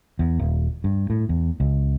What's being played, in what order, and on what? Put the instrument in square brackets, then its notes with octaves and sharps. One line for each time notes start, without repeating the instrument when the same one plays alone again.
[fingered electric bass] E2
D#1
G2
A2
E2
C#2